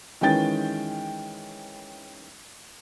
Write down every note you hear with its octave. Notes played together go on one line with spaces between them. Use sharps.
D#3 E3 G#3 C#4 G5 A6